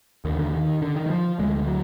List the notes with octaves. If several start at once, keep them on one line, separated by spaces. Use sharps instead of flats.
D#2 D3 D#3
D3
D#3
D3
D#3
D#3
F3
D2 D3 G#3
F#3